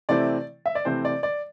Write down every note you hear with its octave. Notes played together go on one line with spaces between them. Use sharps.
C3 E3 A3 C4 E4 D5
E5
D5
C3 E3 A3 C4 E4 C5
D5
D5